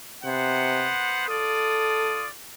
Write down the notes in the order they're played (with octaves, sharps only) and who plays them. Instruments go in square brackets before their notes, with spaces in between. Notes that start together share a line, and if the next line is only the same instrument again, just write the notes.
[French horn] C3 [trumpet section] B3 C5 F#5
[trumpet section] F4 D5 D#6 [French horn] A4